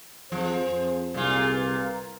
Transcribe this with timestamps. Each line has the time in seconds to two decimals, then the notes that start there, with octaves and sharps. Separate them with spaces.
0.32 F2 F3 G#4 C5
0.66 F2
1.14 C2 A#2 F4 G#4
1.54 A#4 B4